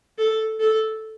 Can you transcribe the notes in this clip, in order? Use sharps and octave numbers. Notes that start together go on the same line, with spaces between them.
A4
A4